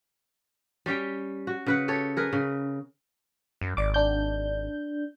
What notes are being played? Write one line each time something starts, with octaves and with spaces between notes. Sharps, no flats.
G3 C#4 G4 G5
F#4
C#3 B4 F#5
G4 A4 C#5
G#4 A#4 B4
C#3
F#2
G#1 D5 D6
D4 G6